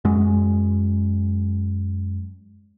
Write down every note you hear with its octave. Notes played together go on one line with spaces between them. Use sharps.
F#2 G#3